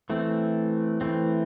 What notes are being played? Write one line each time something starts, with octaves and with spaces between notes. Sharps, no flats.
E3 A3 C4
E3 A3 C4